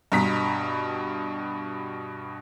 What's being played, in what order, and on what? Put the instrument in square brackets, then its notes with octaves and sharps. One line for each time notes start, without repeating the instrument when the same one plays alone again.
[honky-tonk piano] G2 B2 A#5 B6